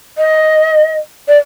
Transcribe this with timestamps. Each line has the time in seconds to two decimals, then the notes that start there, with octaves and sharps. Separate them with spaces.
0.18 D#5
1.28 D5